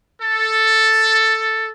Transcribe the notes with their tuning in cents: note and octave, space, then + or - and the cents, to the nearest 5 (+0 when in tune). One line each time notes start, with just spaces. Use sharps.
A4 +5